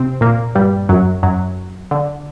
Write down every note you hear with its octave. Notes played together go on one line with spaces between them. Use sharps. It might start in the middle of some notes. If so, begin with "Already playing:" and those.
Already playing: C3 C4
A#2 A#3
G2 G3
F#2 F#3
F#2 F#3
D3